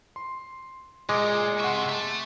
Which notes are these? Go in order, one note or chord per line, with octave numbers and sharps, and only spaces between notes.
C6
A#2 G#3 D6
C3 E5 F#5 C6 C#6
E5 A5